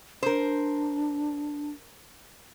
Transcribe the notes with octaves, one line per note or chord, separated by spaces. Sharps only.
D4 A#4 C5